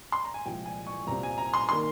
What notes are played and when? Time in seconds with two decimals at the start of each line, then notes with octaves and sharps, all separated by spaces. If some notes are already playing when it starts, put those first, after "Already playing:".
0.12 C6
0.24 A#5
0.34 G#5
0.46 C2 A#2 F3 G#3 G5
0.66 G#5
0.87 C#6
1.07 C2 A#2 G3 C4 A#5
1.23 G#5
1.38 A#5
1.54 C6
1.69 D#3 A#3 C6